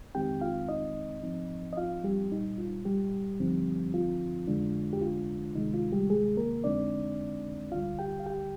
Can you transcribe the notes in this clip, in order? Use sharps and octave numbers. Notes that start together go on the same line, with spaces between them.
F2 D#3 G#3 C4 D#4 G4 G5
F4 F5
D#4 D#5
G#2 F3 C4 D#4
D#5
F4 F5
G3 G4
C2 A#2 G3 D#4
F4
G3 G4
G2 D3 F3 C4 D#4
F4
F2 D3 G#3 D4
G4
F4
D2 C3 D#3 G#3 D#4
F4
G3 G4
G#3 G#4
A#3 A#4
F2 D3 G#3 C4 D4 D#4 D5
D2 D3 G3 F4 F5
G4 G5
F5
G4 G5